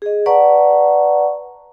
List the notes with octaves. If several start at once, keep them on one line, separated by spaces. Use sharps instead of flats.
G#4 D#5
B4 D5 F#5 A5 A#5 C#6